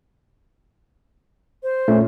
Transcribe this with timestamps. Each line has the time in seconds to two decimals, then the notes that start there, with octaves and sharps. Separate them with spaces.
1.63 C5
1.88 A#2 A3 C#4